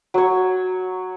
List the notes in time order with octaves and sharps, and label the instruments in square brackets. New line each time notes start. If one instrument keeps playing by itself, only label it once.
[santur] F#3 C#5